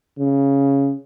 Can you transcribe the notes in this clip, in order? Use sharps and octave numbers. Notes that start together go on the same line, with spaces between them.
C#3